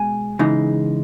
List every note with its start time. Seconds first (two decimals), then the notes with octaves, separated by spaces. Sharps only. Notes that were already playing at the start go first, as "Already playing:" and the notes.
Already playing: B2 G#3 G#5
0.39 C#3 E3 G#3 D#4